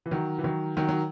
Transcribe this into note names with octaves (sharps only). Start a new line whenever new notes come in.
E3
D#3 F#3
E3
D#3 F#3
D#3 F#3
F#3